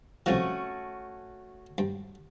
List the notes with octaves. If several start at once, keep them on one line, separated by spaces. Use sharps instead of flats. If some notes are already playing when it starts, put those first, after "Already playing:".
C2 F3 A3 C#4 F#4
G2